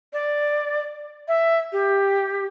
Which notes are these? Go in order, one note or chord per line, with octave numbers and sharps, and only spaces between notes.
D5
E5
G4